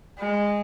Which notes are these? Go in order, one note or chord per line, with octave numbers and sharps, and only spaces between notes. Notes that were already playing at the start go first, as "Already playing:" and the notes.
G#3